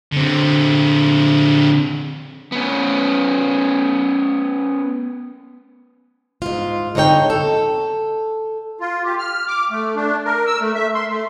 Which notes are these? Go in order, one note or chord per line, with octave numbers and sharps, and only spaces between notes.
D3 C4
B3 C#4
G#2 F4
D3 C4 D#4 C#5 G5
A4
F4
G4
F6
D6
A3
D4
A#4
E6
A3
E5
C6
A3